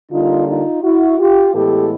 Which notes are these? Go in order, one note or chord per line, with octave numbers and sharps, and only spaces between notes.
D3 G3 A#3 D#4 F4
D#4 F4
E4 F#4
F4 G4
A2 E3 G#3 B3 G4 A4